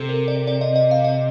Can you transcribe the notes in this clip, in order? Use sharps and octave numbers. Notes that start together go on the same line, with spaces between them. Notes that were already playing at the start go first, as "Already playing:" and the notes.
Already playing: C3 A4
A#4
D5
D5
D#5
D#5
F5
D#5